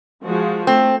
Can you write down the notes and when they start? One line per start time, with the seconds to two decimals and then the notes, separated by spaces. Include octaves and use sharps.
0.24 F3 G#3 F#4
0.67 A3 C4